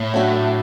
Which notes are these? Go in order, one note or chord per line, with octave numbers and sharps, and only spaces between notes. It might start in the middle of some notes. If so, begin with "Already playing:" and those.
Already playing: A2
F#3 A3 D4 F#4